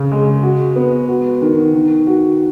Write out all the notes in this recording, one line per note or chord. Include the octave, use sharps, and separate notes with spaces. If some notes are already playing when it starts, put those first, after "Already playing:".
Already playing: C#3
G#3
F#4
B3
F#4
D#3
D#3
F#4